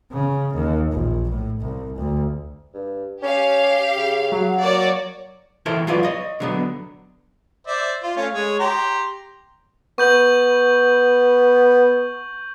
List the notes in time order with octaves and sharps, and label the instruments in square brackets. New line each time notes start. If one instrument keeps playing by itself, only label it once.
[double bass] C#3
D#2
A#1
A2
C2
D2
[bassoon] G2
[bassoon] C#4 [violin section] G4 F5
[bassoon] C#3
[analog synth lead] F#3
[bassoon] A#3 [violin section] F#4 C#5 D5
[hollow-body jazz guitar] E3 E4 A4 A#4 C5 C#5
F#3 F4 B4 D5
C#5 D#5
D3 F#3 B3
[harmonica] C5 D5 E5
F4
A3 C#4 F5
G#3 C#5
G4 A#5 C6
[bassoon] B3 [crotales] C#6 G6 F#7